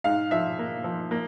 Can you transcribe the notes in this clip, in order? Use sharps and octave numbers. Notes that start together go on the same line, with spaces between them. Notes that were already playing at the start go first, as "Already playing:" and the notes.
G#2 F5
F3 E5
A#3
F3
A#3